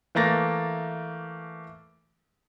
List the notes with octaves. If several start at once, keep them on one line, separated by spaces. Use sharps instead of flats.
E3 A3 A#3 A6 A#6